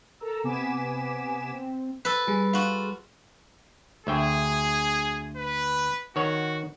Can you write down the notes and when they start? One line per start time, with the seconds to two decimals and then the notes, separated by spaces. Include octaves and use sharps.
0.20 A4 A#4 A#5 E6
0.44 C3 B3 G#5 D6 B6 E7
1.52 C4
2.05 A4 B4
2.27 G3 G#4
2.53 F4 F#4
4.07 D2 G#4 E5 G5
5.37 B4
6.16 D#3 F#4 C#5 F#5